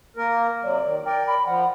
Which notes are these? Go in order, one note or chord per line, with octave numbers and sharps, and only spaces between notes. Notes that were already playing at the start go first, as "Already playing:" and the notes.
A#3 A#4
C3 F#3 D5
D#3
A#4 D5 G5
B5
F3 F#5